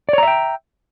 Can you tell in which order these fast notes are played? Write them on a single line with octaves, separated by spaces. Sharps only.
D5 C#5 A#5 E5 G5